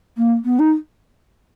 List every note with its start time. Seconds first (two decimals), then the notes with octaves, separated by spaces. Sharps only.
0.17 A#3
0.45 B3
0.59 D#4